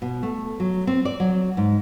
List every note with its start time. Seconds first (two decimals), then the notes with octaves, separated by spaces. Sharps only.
0.02 B2
0.23 A3
0.60 F#3
0.87 C4
1.05 D5
1.20 F#3
1.57 G#2